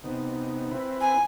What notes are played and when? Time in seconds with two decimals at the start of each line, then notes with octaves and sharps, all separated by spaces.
0.04 C3 B3 D#4
0.71 C4 E4 B4
1.01 G#5